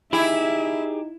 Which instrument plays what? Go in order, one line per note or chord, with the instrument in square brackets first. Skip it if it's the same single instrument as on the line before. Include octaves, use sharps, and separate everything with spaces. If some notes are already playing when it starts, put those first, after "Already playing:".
[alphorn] D#4 [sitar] E4 [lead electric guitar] G4 G#4 [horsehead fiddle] E5